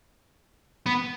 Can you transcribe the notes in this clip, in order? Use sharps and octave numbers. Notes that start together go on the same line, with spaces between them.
B3